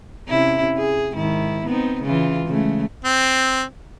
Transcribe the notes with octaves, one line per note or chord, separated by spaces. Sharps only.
C3 C#4 E4
G#4
G#2 D#3 E4
B3 C4 D#4
C#3 E3 F4
C#3 G#3 A3
C4